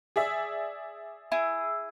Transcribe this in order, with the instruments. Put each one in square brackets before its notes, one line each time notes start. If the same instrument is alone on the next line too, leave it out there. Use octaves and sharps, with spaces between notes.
[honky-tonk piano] G#4 D5 E5
[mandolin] E4 G#4